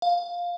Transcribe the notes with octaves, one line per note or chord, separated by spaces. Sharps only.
F5